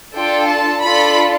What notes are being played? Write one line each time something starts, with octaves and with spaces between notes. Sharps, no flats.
D4 F4 A4 G5
A5
D4 F4 A4 B5